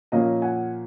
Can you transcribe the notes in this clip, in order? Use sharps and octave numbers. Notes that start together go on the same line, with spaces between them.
A#2 F3 A#3 C#4 D#5 F5
F#5 G#5